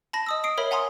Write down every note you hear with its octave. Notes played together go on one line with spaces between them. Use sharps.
A5 B5 A#6
D#5 D#6 E6
D#6 C7 D7
A#4 C#5 E5 B5
F#5 G#5 A#5 C6 D#6